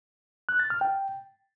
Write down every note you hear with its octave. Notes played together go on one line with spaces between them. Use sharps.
F#6
A6
F6
G5